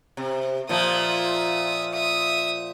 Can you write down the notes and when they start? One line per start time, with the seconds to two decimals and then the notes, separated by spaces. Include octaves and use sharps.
0.17 C3
0.69 A#2 F3 E5 D#6
1.93 E5 D#6